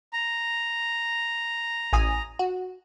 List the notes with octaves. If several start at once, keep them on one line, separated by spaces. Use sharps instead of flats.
A#5
A1 G#5 D#6
F#4